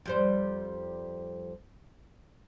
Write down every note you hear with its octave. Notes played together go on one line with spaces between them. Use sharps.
F2 G3 C5